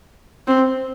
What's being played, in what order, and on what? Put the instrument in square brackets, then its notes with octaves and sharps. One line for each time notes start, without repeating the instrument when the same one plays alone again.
[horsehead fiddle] C4